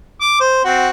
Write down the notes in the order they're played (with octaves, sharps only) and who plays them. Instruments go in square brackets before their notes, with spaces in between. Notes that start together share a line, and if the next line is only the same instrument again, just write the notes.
[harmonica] D6
C5
C4 F#4